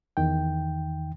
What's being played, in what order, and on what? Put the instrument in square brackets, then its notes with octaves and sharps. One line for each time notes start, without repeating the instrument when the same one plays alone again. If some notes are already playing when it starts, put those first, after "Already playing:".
[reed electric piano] E2 D#3 G5